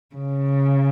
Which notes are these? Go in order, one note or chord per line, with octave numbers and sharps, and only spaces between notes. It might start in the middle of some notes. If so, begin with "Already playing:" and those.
C#3